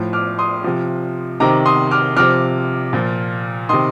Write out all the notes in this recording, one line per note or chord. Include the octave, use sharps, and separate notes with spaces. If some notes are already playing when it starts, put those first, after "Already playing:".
Already playing: A2 F3
D6 F6
C6 D#6
C3 F3
C3 D#3 A#5 D6
C6 D#6
D6 F6
C3 F3 D6 F6
A#2 F3
C3 D#3 C6 D#6